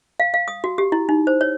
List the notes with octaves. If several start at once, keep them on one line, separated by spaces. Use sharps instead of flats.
F5
F5
D#6
F#4
G4
E4
D#4
C5
C#5